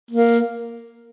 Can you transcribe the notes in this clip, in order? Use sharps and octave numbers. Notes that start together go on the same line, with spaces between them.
A#3